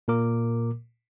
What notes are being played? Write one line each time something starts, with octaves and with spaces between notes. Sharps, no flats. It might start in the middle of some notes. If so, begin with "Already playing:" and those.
A#2 A#3 A#4 D6